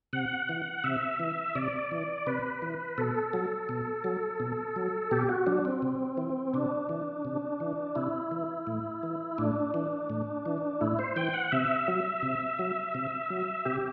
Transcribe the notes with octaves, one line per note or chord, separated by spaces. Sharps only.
C3 F#5
E3
C3 E5
E3
C3 D5
E3
C3 B4
E3
B2 A4
F#3
B2
F#3
B2
F#3
B2 G4
F#4
F#3 D4
C4
C3
E3
C3 D4
E3
C3
E3
C3 E4
E3
A2
E3
A2 D4
E3
A2
E3
A2 E4
C5
E3 G5
F#5
C3 E5
F#3
C3
F#3
C3
F#3
C3 G4